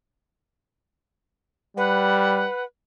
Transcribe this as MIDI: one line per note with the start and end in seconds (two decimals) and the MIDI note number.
1.77 2.47 55
1.77 2.63 71
1.77 2.65 78